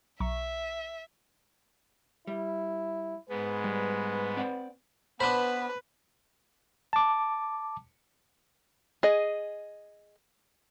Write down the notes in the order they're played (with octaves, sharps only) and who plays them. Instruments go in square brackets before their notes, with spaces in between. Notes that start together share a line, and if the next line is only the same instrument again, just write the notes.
[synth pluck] B1 A#5 C#6 [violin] E5
[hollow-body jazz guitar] G3 [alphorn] E4
[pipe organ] G#2 G#3 B3 [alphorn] B4
[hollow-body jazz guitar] G3
C4 D5 F#5
[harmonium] B3 [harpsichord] D4 C5 [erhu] B4 [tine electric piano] B5
[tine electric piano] A5 D6
[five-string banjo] G#4 D#5